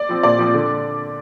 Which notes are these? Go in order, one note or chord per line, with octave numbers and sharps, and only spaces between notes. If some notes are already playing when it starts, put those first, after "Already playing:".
Already playing: D5
F3 C4
A#2 D5
F3 C4
D3